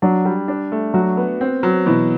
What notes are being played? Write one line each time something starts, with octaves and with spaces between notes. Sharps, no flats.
F#3 D4
G3
D4
A3
F#3 F#4
B3
C4
F#3
B2 E3